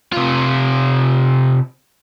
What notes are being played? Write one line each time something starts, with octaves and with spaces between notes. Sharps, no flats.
C3 F4